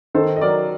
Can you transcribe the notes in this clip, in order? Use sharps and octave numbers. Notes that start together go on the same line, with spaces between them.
D#3 A4 C5
D#5
F#3 A#4 D5